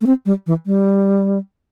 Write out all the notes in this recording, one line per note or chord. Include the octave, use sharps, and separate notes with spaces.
A3
C4
G3
E3
G3